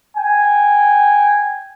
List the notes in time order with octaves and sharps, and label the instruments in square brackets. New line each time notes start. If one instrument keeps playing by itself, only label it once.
[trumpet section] G5 G#5